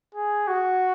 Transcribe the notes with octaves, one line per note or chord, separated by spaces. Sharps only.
G#4
F#4